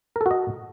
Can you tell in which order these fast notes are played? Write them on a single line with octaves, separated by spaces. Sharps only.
A#4 A4 F#4 D#5